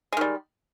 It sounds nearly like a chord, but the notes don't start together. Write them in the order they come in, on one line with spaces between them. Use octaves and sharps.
G#3 D#3 G3